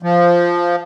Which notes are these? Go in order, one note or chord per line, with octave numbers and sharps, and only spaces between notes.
F3